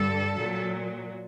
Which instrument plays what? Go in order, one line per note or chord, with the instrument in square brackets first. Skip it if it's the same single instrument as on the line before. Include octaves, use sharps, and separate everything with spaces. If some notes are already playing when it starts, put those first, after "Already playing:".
Already playing: [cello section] G2 D3 G3 A4
A#2 F#3